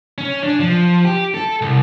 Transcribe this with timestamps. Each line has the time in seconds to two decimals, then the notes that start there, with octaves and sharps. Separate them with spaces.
0.18 C#4
0.44 D4
0.60 F3
1.05 G4
1.34 A4
1.61 C2